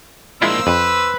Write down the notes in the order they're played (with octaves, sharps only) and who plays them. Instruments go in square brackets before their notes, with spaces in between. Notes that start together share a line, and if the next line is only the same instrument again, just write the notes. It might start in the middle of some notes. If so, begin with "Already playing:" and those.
[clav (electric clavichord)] G#3 E4 F4 [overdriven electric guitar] A#3 D4 [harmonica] C5 E6
[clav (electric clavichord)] F2 [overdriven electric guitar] B4